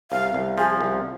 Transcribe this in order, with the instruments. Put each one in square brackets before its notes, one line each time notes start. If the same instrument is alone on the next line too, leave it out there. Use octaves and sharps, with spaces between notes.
[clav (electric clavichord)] C2 [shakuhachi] F5
[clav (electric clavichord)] C2
[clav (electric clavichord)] F3 [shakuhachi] G#4
[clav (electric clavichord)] C2